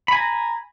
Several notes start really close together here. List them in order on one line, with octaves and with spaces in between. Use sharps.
B5 G#5 A#5